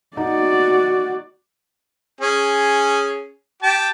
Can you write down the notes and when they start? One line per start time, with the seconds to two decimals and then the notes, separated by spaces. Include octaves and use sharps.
0.17 D#4 F#4 D5 F#5
2.21 C#4 G#4
3.63 G4 A5